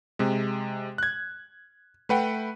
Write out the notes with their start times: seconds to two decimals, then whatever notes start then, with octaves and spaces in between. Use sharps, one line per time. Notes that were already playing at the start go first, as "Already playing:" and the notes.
0.19 C3 G#3
0.98 F#6 G#6
2.09 A3 B4 F#5 G5